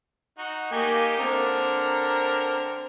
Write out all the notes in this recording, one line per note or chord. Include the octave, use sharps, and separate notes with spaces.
D#4 F#4
A#3 D#4 G4 G#5
D3 C4 A#4 A#5